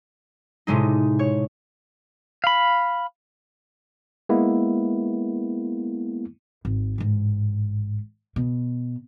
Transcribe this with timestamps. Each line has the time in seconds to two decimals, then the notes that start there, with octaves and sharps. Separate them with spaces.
0.67 A2 C3 G#3 D#4
1.19 C#5
2.44 F5 B5
4.29 G#3 A#3 B3 E4
6.65 G#1
6.98 A1 G#2
8.36 B2